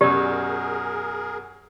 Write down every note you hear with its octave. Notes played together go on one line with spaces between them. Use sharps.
F#2 B2 G4 G#4 A#4 D5